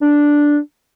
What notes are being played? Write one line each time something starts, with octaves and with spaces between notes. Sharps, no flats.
D4